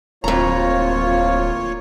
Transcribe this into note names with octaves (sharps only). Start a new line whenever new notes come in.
D1 F2 A#3 F4 C#5 A#5